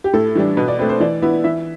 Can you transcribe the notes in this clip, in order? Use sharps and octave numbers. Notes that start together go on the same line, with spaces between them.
G4
A2 A4
E3 G3 D4
B2 B4
D5
A3 C4 B4
C5
E3 D5
B3 E4
E3 E5